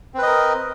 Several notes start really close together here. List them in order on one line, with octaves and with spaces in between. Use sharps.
C4 B4 D#5 A#4